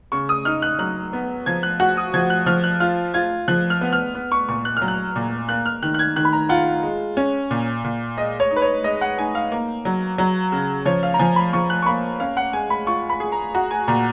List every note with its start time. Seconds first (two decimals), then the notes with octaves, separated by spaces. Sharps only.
0.12 C#3 C#6
0.29 D#6
0.45 D#4 F6
0.62 F#6
0.79 F#3 F#6
1.13 B3
1.46 F3 G#6
1.63 F#6
1.80 F#4 F#6
1.97 D#6
2.14 F3 G#6
2.30 F#6
2.46 F3 F6
2.64 F#6
2.80 F4 F6
3.14 F4 G#6
3.48 F3 F#6
3.70 F6
3.81 B3
3.93 F6
4.15 B3
4.32 C#6
4.49 A#2 C#6
4.65 F#6
4.77 F6
4.82 F#3
4.88 F#6
5.16 A#2
5.49 A#3 F#6
5.66 F6
5.83 D#3 F#6
5.94 F#6
5.99 G#6
6.16 D#3 F#6
6.25 B5
6.33 A#5
6.49 F4 F#5
6.83 G#3
7.17 C#4
7.51 A#2
7.84 A#2
8.17 G#3 D#5
8.40 C#5
8.51 D#4
8.56 B4
8.62 C#5
8.84 G#3 D#5
9.01 F#5
9.18 D#4 G#5
9.35 F5
9.52 A#3
9.85 F#3
10.18 F#3
10.52 C#3
10.86 F3 C#5
11.03 F5
11.14 A#5
11.19 F3 G#5
11.36 B5
11.53 F3 C#6
11.70 F#6
11.82 C#6
11.86 A#3 B5
12.20 C#4 F5
12.37 F#5
12.53 G#3 G#5
12.70 B5
12.87 F4 C#6
13.09 B5
13.20 G#4
13.32 A#5
13.54 F#4 A#5
13.71 G#5
13.88 A#2 A#5